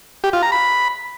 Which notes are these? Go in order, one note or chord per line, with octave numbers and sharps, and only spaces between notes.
G4
F4
A#5
B5